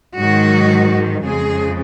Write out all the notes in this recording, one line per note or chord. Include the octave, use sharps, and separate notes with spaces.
G#2 D#3 F#3 F#4
F2 C#3 F3 G#3 G#4